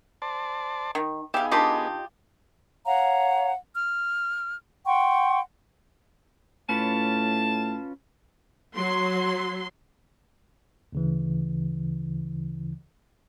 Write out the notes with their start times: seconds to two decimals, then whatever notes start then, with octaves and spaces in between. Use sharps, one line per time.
0.22 C5 D5 A5
0.95 D#3
1.34 B3 D#4 G4 G#4 E5 F5
1.51 D#3 D4 F4 G4 D#5 B5
2.86 C#5 F5 F#5 A#5
3.74 F6
4.86 F#5 G5 C6 C#6
6.69 A2 C#4 F4 B4 A5
8.76 F#3 C6
10.92 D2 C#3 E3